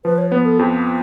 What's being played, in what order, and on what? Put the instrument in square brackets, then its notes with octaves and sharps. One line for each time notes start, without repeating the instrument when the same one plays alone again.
[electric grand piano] F3 [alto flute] B4
[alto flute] C#5
[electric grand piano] B3 [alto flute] B4
[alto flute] A4
[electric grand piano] F2 [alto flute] F4